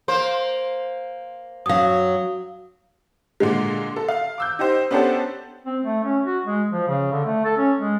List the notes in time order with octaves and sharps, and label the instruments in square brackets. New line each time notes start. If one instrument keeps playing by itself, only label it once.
[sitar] A#3 C5
[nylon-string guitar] F#2 F#3 [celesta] F5 D#6
[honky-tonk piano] A#2 D3 G#3
A4
F5
D6 E6 G6
D#4 G4 C5
B3 C#4 D4 G4 A4 C5
[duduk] C4
A3
C#4
F#4
G#3
F3
C#3
D3
A3
A4
C#4
G#3